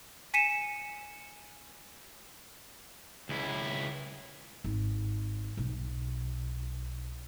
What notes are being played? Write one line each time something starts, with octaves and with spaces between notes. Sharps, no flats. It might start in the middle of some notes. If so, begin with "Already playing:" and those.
G#5 B6 C#7 D#7 E7
C#2 E4
G#1
B1